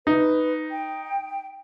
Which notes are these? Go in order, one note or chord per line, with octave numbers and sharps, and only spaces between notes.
D#4 B4
G5